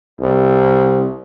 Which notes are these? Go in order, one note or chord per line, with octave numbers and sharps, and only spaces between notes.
C2